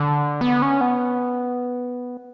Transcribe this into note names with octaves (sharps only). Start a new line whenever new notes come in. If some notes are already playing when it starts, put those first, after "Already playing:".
Already playing: D3
B3
C#4
B3